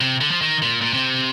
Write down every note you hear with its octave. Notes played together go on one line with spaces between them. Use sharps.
C3
D3
F3
D#3
A#2
A#2
C3